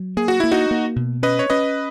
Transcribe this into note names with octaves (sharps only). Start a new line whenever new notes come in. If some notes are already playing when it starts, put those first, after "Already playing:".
Already playing: F#3
A#3 G#4
F#4
A#3 E4
D#4 F#4
A#3
B2
C#4 B4 D#5
C#5
C#4 B4 D#5